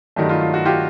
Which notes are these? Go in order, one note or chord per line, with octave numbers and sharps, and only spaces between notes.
G2 D#3 F#3 A3
F4
F4
F#4
F4 G4